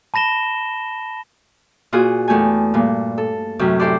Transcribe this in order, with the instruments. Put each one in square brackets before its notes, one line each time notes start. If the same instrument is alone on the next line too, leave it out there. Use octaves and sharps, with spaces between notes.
[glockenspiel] A5 B5 A#6 E7 G7
[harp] A#2 F4 F#4 G#4
E2 A3 G4 G#5
G2 A#2
A4
F#2 A2 C3
E4 G4 A4 C5 D5